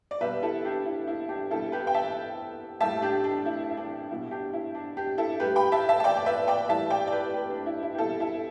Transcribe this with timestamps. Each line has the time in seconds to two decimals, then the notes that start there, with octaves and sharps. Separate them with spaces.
0.11 D5
0.21 B2 G3 B4 E5
0.42 E4 A4
0.65 D4 G4
0.86 E4
1.08 E4
1.29 D4 G4
1.51 B2 G3 E4 A4
1.72 G4 B4
1.87 G5
1.94 E5 A5
2.81 A2 G3 E5 A5
3.02 D4 G4
3.24 D4
3.46 E4
3.71 E4
3.77 D4
4.10 B2 G3 E4
4.31 D4 G4
4.53 E4
4.75 D4
4.97 D4 G4
5.18 E4 A4
5.40 A2 G3 G4 B4
5.56 G5 B5
5.72 E5 A5
5.89 E5 A5
6.00 A5
6.04 D5 G5
6.17 D5
6.26 B4 E5
6.48 D5 G5
6.69 A2 E3 G3 E5 A5
6.90 D5 G5
7.07 D5
7.12 G4 B4
7.34 G4 B4
7.50 D4
7.66 E4
7.83 E4
7.94 G4
7.98 B2 G3 E4 A4
8.20 E4 A4